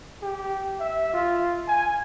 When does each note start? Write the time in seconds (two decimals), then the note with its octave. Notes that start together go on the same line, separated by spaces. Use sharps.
0.22 G4
0.80 E5
1.14 F4
1.68 G#5